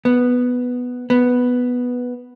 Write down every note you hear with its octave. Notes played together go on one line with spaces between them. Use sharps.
B3
B3